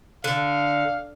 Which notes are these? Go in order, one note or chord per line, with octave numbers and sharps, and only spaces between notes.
D3 F5